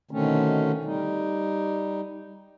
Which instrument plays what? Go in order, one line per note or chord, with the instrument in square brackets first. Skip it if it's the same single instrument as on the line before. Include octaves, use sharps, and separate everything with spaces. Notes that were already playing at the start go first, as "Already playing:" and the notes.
[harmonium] B2 D3 D#3 A3 C4 C#4
G3 D#4